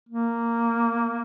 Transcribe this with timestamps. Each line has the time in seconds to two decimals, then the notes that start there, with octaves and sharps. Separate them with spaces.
0.09 A#3